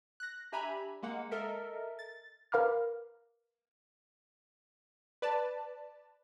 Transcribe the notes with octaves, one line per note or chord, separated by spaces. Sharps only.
F#6 A#6
D4 G4 E5 G#5 A#5 B5
G#3 A#3 F#5
A4 A#4 D#5 E5
A6
A#4 B4 F5 A#5 D6 F6
B4 D5 A5